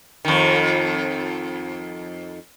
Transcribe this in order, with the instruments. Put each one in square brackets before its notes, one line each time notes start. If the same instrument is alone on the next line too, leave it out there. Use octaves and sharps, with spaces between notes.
[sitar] F2 D#3